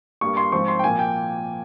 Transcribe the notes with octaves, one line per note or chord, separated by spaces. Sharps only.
G2 G3 A#3 C#6
C6
G#2 F3 C4 C#6
C6
G5
A#2 F3 A#3 G#5
G5